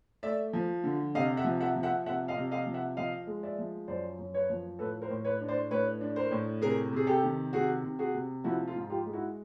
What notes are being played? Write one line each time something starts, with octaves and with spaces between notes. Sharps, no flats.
A3 D5 E5
F3
D3
C3 D#5 F5
E5 F#5
F3
E5 F#5
F3
E5 F#5
C3 E5 F#5
D#5 F5
C3
D#5 F5
F3
E5 F#5
F3 D#5 F5
G#3
D5 E5
F3
F#2 C5 D5
F#2
B4 C#5
F3
A2 A4 B4
A#4 C5
A2
B4 C#5
D4
C5 D5
A2 B4 C#5
D4
A#4 C5
A2
C3 G#4 A#4
C3 G#4
G4 A4
D#3
C3 F#4 G#4
C3
F#4 G#4
C3
F3 E4 F#4
F4
G#2
F4 G4
G#3
E4 F#4